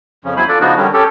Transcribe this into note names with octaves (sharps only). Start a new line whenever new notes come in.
F2 C#3 F3 C#4
E2 F#3 E4 C5 G#5 B5
D4 F4 A4 D5
C#3 F3 B3 D4 D#4 F#4
D3 D#3 G3 C#4
C#4 G4 A4